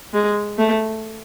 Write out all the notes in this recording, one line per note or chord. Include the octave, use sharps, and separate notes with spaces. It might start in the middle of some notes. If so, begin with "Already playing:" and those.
G#3
A3